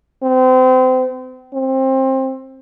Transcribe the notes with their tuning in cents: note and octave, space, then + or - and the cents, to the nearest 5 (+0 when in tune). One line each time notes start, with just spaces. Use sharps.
C4 -30
C4 +20